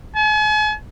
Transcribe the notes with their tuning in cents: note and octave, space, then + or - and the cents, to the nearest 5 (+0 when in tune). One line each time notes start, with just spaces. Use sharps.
G#5 +45